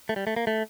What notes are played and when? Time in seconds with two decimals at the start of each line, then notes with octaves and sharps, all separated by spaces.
0.09 A3
0.16 G3
0.27 A3
0.36 A#3
0.47 A3